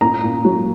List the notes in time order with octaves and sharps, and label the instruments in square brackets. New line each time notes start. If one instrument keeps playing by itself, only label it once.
[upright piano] A#2 A#5
A#2
F#3